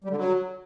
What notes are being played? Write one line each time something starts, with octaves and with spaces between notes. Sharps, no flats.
G3
D3
F#3